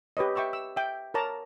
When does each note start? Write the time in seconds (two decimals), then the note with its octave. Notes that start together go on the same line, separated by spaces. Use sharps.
0.17 G4 B4 C#5 D#5
0.35 E5 G5 C#6 D6 E6
0.53 E6
0.77 E5 G5
1.14 A#4 C#5 A5 A#5 D6